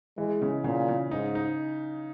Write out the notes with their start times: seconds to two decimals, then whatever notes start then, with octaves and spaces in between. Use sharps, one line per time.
0.18 E3 G#3
0.42 C#3
0.64 A#2 C#3
0.88 C#3
1.11 G#2 D#4
1.35 D#4